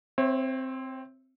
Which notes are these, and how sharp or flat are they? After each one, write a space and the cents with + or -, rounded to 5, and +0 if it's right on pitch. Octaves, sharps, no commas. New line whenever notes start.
C4 +0 C#5 -35 E5 +15